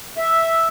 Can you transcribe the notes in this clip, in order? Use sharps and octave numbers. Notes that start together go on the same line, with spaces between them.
E5